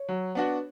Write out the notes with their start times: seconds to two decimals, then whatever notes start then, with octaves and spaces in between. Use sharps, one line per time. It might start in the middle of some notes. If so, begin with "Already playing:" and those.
Already playing: C#5
0.09 F#3
0.35 B3 D4 F#4